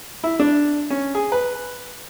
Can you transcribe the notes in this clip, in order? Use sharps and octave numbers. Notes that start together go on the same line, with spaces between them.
E4
D4
C#4
G#4
B4